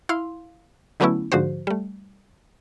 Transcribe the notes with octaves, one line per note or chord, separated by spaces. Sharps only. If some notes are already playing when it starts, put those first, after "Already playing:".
E4 F5 C6
D3 F#3 A3 B3 C#4 E4
G#2 D3 F3 F#4 C5
G3 A3